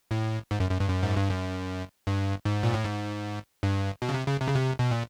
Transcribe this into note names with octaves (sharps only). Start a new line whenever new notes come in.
A2
G#2
F#2
F#2
G2
F#2
G#2
G2
F#2
G2
G#2
A#2
A2
G#2
G2
B2
C#3
C3
C#3
C3
C#3
C3
B2
A#2